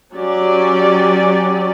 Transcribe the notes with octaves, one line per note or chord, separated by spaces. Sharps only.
F#3 C#4 G4 D5